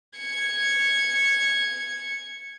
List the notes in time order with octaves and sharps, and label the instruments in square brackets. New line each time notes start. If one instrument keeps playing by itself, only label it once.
[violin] G#6 C#7